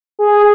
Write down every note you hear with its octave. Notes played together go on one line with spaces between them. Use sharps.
G#4